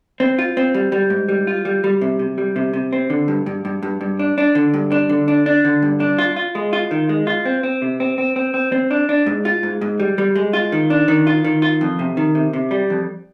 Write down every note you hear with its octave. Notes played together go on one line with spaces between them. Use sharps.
C4
F4
C4
G3
G3
G#2
G3
F4
G3
G3
C3
C3
G3
C3
C3
C4
D3
G2
G2
G2
G2
G2
D4
D4
D3
G2
D4
D3
D4
D4
D3
G2
D4
F4
F4
G#3
F4
D#3
G#3
F4
C4
C4
C3
C4
C4
C4
C4
C4
D4
D4
G#2
F4
G#2
G#2
G3
G3
G#3
F4
D#3
D4
D#3
F4
D#3
F4
F2
C3
D#3
C3
C3
G3
F2